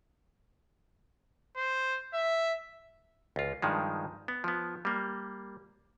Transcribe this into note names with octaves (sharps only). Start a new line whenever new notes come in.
C5
E5
C#2 F4
G2 D#3 F3 G#3
B3
F3 B3
G3 A#3